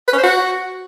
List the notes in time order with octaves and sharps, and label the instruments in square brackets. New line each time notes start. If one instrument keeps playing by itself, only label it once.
[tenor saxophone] B4
C#4
C5
F#4